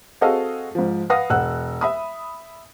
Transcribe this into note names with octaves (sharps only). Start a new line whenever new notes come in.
C4 F#4 G#4 A4 D#5 F5
G#2 F3
B4 F5 F#5 D#6 A#6
E1 F#5 E6 F#6
E5 B5 D#6